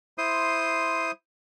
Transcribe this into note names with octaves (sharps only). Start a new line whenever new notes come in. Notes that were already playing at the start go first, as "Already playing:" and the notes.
E4 C5 C6 D#6